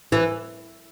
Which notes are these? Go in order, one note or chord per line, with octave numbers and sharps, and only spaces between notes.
E3